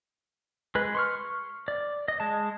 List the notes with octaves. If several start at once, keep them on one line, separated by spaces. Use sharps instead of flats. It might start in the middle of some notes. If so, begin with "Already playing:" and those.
G#3 B4
C6 C#6 F6
D5
D#5
G#3 A5